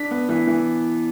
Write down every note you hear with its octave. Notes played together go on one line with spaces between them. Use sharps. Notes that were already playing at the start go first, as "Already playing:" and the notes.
Already playing: D4 B6
B3
E3
E3